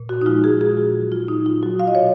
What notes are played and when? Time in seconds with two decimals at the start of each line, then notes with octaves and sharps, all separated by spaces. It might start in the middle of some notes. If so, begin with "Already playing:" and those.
Already playing: A#2
0.09 F#4
0.21 D#4
0.26 F3 G#3 F4
0.44 G#4
0.60 A#2 G#4
0.77 F#4
0.95 F#3
1.12 F4
1.28 A#2 D#4
1.46 F4
1.63 F#3 F#4
1.80 F5
1.87 D#5
1.95 C#5
1.98 B2